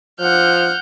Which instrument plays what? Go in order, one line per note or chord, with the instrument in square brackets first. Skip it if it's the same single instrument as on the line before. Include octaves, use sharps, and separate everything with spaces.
[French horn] F3 [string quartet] F#5 F6 G6